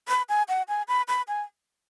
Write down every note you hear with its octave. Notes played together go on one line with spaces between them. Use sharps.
B5
G#5
F#5
G#5
B5
B5
G#5